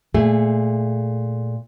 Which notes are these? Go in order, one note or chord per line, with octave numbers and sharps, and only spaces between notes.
A#2 A3 G#4